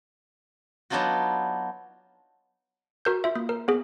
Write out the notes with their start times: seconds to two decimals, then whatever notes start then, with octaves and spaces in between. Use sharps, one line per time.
0.90 F#3 B3 D4 D#4 F4 F#4
3.05 F#4 A#4 G6
3.24 F4 E5
3.36 A#3
3.49 A#4
3.68 B3 G#4